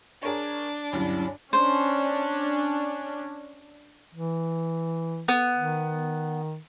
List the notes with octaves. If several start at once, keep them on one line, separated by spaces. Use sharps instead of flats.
D4 G#4 A#4 C#5
D2 G2 F#3 C#4 E4
C#4 D4 C5
E3
B3
D#3